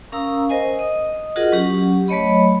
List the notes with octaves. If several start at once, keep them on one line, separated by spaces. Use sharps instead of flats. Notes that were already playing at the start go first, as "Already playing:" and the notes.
C#4 A#4 F5 A#5 D#6 E6
A#4 C5 D#5 G#5
D#5 D#6
F4 F#4 G#4 A#4 D#5 F#5
F#3 C#4 G4 F#5
F#3 A3 C#5 D#5 B5